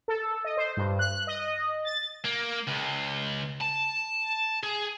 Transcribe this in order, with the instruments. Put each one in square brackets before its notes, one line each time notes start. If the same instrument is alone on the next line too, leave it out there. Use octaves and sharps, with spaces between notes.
[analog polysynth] A4
D#5
C5
G2
F#6
D#5
A6
[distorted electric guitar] A#3
C#2
A5
G#4